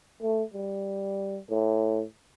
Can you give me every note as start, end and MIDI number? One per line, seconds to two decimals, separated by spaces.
0.23 0.43 57
0.54 1.39 55
1.50 2.03 45